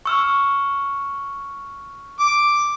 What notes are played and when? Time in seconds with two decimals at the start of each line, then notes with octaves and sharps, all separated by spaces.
0.05 C#6 E6 F6
2.20 D6